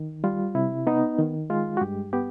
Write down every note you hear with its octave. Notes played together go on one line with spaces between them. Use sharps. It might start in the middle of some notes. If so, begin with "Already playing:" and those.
Already playing: D#3
G3 F4
C3 E4
B3 D#4
D#3
G#3 F4
F#4
G2 G4
B3 G4